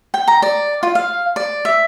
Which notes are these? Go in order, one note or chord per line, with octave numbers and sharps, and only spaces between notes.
G5
A#5
D5
F4
F5
D5
E5